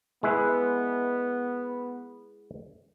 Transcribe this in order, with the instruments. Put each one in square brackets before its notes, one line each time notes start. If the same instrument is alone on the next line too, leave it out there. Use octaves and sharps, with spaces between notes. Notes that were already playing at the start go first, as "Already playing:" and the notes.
[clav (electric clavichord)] G#3 E4 B4 [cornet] B3